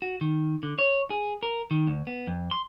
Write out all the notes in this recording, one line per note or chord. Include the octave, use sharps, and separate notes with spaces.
F#4
D#3
D3
C#5
G#4
A#4
D#3
D2
B3
F2
C6